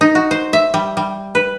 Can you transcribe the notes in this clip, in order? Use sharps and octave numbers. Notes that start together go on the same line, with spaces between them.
D#4
F#4
C5
E5
G3
G3
B4